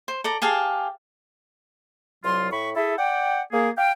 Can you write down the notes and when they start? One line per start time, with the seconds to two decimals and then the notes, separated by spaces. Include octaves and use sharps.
0.08 C5
0.24 A4 D5 A#5
0.42 G4 G#4 F5 A5
2.24 C2 F#3 F4 C6
2.52 A2 B5 C#6
2.76 E4 G#4 A4 E5
2.98 D5 F#5 G5
3.52 A#3 G#4
3.77 F5 G5